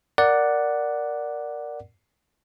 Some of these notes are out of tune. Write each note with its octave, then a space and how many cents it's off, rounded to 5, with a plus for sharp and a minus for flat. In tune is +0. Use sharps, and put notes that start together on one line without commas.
A#4 +0 D5 +0 F#5 +0